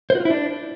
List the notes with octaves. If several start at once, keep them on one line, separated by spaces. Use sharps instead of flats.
C5
F#4
F4
E4
D4